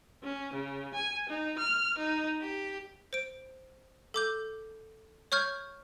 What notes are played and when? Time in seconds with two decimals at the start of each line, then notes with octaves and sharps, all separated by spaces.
0.21 C#4
0.54 C#3
0.94 G#5
1.28 D#4
1.57 F6
1.98 D#4
2.41 G4
3.13 C5 D7
4.14 A4 D6 G6
5.32 C#5 C#6 F6 G6 G#6